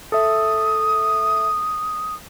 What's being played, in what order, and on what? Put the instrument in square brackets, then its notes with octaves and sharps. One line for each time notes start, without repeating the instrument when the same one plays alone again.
[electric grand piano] A4 E5 [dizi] D#6